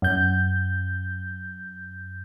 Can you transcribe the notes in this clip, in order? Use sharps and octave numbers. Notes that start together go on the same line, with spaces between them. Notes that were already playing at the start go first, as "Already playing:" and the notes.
F#2 G6